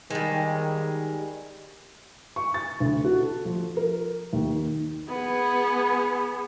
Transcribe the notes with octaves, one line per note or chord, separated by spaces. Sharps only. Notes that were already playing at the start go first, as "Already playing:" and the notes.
D#3 G3 G#3
C#6
A6
D2
F#4
A4
F3
A#4
D#2
B3 G#4